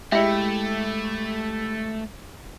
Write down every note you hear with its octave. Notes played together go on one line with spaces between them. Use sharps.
G#3 A3 E4 G4 E5 G5